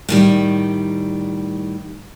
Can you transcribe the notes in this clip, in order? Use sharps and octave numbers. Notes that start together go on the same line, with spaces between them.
A2 D#3 G3